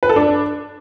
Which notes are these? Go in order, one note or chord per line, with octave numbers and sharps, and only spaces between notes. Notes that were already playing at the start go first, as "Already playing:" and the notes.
B4
A4
D4